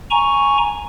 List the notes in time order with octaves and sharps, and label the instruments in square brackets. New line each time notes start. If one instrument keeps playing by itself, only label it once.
[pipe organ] G#5 A#5 C#6